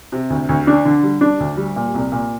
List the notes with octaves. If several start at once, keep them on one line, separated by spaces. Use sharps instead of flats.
C3
D2
D2
D4
D3
G3
D4
D2
G3
A#2
C2
A#2